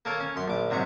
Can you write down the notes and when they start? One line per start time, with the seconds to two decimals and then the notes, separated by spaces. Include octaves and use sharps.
0.05 A#3 A4 A#4 C#5
0.20 C#4
0.36 F#2 C6
0.48 A#1 D6
0.70 G#2 C3 F#3 A#5 C#6